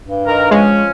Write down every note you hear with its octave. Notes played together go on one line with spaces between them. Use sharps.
G2
D#3 A#4
F3 G#3 C#4